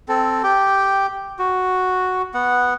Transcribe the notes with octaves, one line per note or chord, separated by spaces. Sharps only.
C4 A4
G4 G5
F#4
B3 F#5